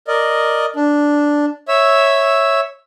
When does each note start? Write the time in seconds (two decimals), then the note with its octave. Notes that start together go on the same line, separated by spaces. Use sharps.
0.08 A#4 D5 D#5
0.76 D4
1.68 C#5 E5 E6